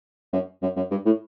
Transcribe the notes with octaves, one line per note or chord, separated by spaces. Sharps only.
F#2
F#2
F#2
G2
A2